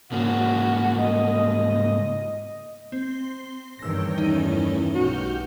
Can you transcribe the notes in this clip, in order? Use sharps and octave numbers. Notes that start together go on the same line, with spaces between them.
G#2 C#3 A#3 F#4
D#5
C4 C6
E2 G2 D#3 C#5 G5 E6 A#6
A3 C#4 D#4 E4 G7
B1 F#4 G4 F6 G6